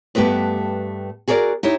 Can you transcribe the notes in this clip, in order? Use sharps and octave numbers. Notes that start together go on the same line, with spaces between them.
G2 A3 B3 G4 B4
F#4 G#4 A#4 C#5 D5
D#4 E4 G4 C#5